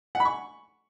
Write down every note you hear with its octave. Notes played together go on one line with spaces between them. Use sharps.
F#5
B5
C#6